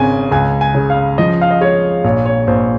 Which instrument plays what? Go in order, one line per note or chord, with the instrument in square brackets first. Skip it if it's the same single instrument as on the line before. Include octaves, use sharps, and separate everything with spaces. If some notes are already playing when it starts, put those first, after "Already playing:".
Already playing: [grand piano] G#1 C#3 G#5
C#2 G#5
G#5
C#3
F5
F3 D#5
F5
D#5
G#3 C#5
A#1 C#5
C#5
A#1 C5